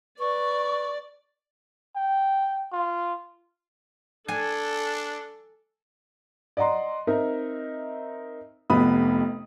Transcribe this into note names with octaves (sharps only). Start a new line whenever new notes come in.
B4 D5 C#6
G5
F4
D4 A4 G#5
D5 D#5 F#5 A#5 C6
C4 D#4 A#4 E5
F1 F2 C3 B3 B5 D#6